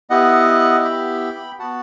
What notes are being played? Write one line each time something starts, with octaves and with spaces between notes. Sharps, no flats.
B3 E4 G4 D#5 F#5
G5 B5
B3 F#4 F#5 A5